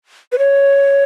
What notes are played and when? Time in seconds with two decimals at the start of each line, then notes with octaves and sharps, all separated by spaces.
0.32 B4
0.39 C#5